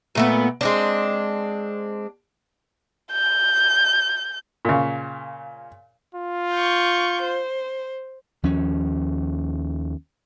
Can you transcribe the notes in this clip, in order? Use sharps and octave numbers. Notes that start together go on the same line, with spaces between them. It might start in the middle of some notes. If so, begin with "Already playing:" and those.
A#2 A3 B3
G#3 C4 D4
G6
A#2 C#3
F4
C#6 G6
C5
D#2 F3 C#4